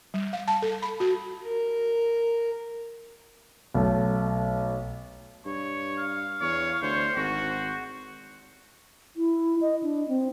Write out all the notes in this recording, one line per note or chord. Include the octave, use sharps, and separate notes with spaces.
G3
F5
A5
A4
B5
F#4
A#4
B1 A3
G2 C#5
F5
E2 C#5
D2 C5 C#5
G#1 F#4
C5
E4
D#5
D4
C4